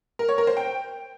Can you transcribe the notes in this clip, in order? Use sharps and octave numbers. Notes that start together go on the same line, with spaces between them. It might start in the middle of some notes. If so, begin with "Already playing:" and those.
A#4
C#5
A#4
C5
G5